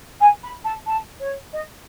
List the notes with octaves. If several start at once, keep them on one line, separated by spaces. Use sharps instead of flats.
G#5
B5
A5
A5
C#5
D#5